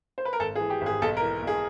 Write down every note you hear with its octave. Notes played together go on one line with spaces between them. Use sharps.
C5
B4
A#4
G#1 A4
G#4
E3
G4
G#1
G#4
B1 A4
A#4
E3
B1
G#4